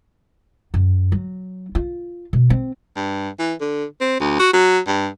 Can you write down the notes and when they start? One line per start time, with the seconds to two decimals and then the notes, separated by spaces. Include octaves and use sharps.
0.74 F#2
1.12 F#3
1.75 F4
2.33 B2
2.50 C4
2.96 G2
3.39 E3
3.60 D3
4.00 C4
4.20 D2
4.40 F#4
4.53 F#3
4.87 G2